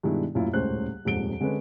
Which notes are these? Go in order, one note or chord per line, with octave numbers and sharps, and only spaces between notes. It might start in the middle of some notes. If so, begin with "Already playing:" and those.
G2 B2 D#3 G#3 D4 E4
D#1 A1 F#2 A#2 E4 F4
D#1 C#2 A2 C#4 C5 F#6
D#1 F2 G#2 D7 G7
D3 G#3 C4 C#4 B4